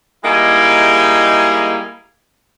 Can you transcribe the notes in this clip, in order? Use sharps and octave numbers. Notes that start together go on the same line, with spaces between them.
G3 G#3 A#3 D#4 E4 G#4